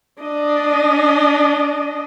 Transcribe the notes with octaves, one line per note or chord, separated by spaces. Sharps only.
D4 D#5